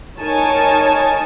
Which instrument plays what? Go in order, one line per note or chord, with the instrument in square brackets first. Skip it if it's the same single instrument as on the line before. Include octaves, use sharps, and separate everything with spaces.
[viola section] D#4 A#4 C#5 G#5 A5